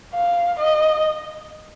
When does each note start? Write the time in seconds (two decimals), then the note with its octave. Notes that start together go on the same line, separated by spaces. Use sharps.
0.14 F5
0.60 D#5